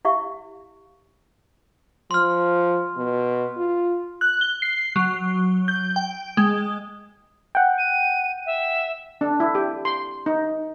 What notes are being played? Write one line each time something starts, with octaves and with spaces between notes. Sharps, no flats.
E4 G4 E5 F5 C#6
F3 C6 F6
B2
F4
F#6
G7
C7
F#3
G6
G5
G#3
F#5 G5
D#7
E5
D4
E4
G4
C6
D#4